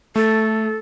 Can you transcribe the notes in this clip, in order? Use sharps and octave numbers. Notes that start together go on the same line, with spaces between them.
A3 A4